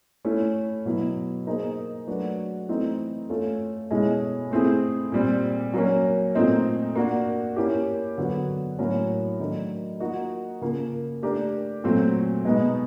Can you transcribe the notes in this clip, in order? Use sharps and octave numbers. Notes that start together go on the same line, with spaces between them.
A3 C#4 E4
B2 F#3 B3 E4
A#3 D#4 G#4 C5
F#3 A3 D4 F#4 B4
E3 A3 C4 D#4
A3 C#4 F4 A4
B2 G#3 C#4 E4 G#4
A3 C4 E4 G#4
A#2 G3 C4
F#3 A#3 C#4
A#2 F3 A3 C4 D#4
A#3 D4 F#4 A#4
A#3 C#4 E4 G4
D3 F#3 B3 D4 F#4
A2 F#3 A#3 C#4
D#3 F#3 A3 D4
F3 A#3 D#4 F#4
C#3 F3 A#3
A3 D4 G4 A#4
A#2 F#3 A3 C4
B2 G#3 B3 D#4